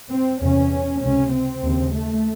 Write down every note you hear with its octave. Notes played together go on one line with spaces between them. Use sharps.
C4
E2 C3 C#4
C#2 C3 C#4
C4
D#2 C#3
A3